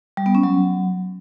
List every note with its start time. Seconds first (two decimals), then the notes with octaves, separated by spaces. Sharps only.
0.17 G3
0.26 B3
0.35 C#4
0.43 F#3